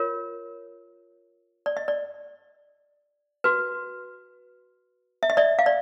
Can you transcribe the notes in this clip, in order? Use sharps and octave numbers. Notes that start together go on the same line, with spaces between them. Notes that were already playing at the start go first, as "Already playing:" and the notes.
Already playing: F4 A#4 C#5
D5
D#5
D5
F#4 B4
E5
D#5
D5 E5
F5
D5